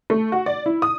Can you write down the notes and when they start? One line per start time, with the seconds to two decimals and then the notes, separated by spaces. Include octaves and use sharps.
0.10 A3
0.32 F#4
0.46 D5
0.66 E4
0.82 D#6